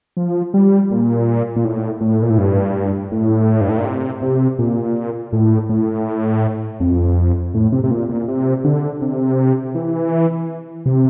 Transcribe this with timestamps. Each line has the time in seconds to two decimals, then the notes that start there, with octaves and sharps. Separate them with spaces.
0.17 F3
0.54 G3
0.91 A#2
1.56 A#2
1.65 A2
2.01 A2
2.22 A#2
2.30 A2
2.38 G2
3.12 A2
3.61 G2
3.69 A2
3.78 A#2
3.85 C3
4.22 C3
4.59 A#2
5.33 A2
5.69 A2
6.80 F2
7.54 A2
7.72 C3
7.84 C3
7.91 A#2
8.09 A#2
8.28 C3
8.64 D3
9.01 C3
9.75 E3
10.86 C3